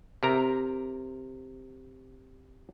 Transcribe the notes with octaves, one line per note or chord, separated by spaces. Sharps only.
C3 A#4 A#5